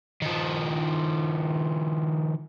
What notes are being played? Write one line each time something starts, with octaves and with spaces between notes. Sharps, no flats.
D#3 F3